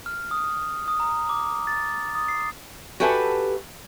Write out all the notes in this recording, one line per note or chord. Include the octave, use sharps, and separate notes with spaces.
F6
D#6
D#6
A#5
D6
A6
D#6
C7
F#4 G4 A4 B4 E5 G#5